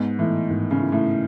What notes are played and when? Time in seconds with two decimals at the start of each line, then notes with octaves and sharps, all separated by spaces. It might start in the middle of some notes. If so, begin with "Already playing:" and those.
Already playing: G#2 B3
0.19 A2 E3
0.51 G#2 D#3
0.71 C#3
0.82 E4
0.92 A2